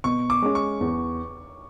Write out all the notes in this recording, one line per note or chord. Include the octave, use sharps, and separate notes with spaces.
B2 C#6
D6
G#3 C#4
C#6
E2